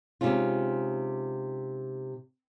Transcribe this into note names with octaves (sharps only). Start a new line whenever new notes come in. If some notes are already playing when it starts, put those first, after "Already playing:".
C3 G#3 C#4 D#4 F4